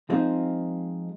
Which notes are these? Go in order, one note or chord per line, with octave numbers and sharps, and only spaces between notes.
F3 G#3 C4 D#4 F4